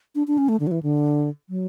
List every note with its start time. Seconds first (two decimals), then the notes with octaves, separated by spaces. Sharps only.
0.15 D4
0.27 D4
0.38 C#4
0.49 A3
0.60 D3
0.67 F#3
0.71 E3
0.83 D3
1.49 F#3